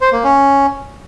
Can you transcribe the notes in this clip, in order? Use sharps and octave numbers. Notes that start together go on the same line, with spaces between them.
C5
A#3
C#4